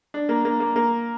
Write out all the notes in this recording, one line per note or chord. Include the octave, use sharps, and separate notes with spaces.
D4
A#3
A#3
A#3
A#3